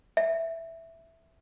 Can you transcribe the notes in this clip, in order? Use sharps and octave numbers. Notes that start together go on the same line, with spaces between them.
E5